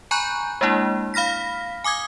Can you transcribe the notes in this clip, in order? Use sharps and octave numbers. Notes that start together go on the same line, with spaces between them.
G#5 A#5 B5 C#6 F#6 G6
G#3 A#3 D4 E4
F5 B5 F6 A#6 B6
G#5 D6 D#6 G#6